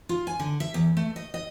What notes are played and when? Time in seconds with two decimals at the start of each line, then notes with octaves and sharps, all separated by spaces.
0.09 F4
0.27 G#5
0.40 D3
0.60 E5
0.74 E2
0.97 A3
1.16 D#5
1.34 D#5